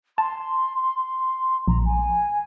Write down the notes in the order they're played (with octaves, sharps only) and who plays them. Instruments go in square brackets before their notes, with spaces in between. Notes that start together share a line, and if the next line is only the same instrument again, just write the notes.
[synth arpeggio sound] A5 [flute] C6
[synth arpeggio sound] A#1 [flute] A#5
[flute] G#5